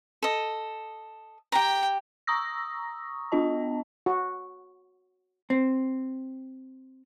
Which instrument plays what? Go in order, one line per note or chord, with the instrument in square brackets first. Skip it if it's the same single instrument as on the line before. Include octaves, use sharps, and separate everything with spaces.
[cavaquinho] A4 D#5
[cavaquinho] G4 A#5 [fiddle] G5
[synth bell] A#5 C#6 D#6 E6 A#6
B3 D4 F4 D#5 A5
[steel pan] F#4
[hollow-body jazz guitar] C4